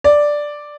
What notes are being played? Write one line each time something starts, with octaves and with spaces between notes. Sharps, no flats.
D5